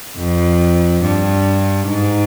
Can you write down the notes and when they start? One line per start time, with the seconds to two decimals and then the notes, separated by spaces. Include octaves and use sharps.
0.17 F2
1.02 G2
1.87 G#2